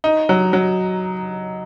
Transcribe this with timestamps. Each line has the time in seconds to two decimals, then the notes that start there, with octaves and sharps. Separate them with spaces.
0.04 D#4
0.29 F#3
0.53 F#3